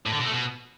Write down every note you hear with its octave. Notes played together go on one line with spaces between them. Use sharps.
A2
D3
B2
A3
B2